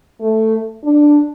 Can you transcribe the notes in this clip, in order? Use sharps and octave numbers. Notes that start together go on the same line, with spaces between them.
A3
D4